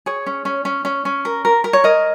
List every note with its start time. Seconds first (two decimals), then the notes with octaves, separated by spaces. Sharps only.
0.06 G#4 C#5
0.26 C#4
0.45 C#4
0.65 C#4
0.85 C#4
1.05 C#4
1.25 A#4
1.45 A#4
1.64 A#4
1.73 C#5
1.84 A#4 D#5